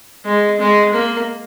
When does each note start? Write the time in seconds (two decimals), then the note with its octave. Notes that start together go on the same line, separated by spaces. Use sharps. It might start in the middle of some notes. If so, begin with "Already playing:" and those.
0.25 G#3
0.59 G#3
0.93 A#3